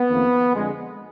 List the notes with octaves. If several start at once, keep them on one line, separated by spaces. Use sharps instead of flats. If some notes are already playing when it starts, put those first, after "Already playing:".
Already playing: B3
F2 D#3 A#3
F2 D3 G#3